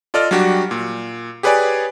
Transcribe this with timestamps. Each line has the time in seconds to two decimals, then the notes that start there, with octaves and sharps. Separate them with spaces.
0.14 F4 A4 D5 D#5 F6
0.31 F#3 G3 D4 F#4 G4
0.71 A#2
1.43 G4 G#4 B4 C#5 D5 G#5